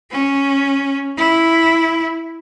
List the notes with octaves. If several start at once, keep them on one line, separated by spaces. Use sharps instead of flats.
C#4
E4